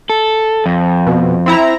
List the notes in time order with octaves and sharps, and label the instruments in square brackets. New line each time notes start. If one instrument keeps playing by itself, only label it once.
[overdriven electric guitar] A4
F2
[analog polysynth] B2
C4 E4 A#5